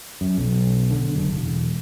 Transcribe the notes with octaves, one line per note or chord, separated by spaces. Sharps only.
F#2
B1
D3
F#1
E1